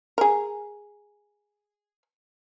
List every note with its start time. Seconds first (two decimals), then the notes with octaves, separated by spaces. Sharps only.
0.18 G#4 A#4